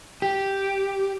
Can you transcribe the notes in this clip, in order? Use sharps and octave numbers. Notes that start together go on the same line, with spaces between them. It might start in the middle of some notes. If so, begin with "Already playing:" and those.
G4